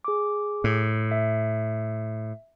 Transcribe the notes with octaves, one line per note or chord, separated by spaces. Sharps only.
G#4 D6
A2
E5